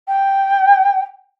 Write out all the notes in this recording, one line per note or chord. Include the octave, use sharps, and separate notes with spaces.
G5